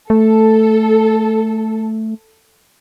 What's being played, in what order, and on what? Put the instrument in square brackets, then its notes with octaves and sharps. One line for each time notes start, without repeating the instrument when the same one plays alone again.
[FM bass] A3 [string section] A4